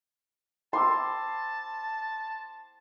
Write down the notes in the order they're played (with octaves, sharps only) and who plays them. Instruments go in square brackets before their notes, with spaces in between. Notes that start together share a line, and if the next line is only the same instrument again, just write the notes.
[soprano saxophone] A5 [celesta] B5 D6 E6 [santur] C6